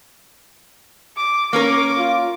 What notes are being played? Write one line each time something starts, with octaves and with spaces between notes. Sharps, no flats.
D6
A#3 C#4 A#4 D6
F4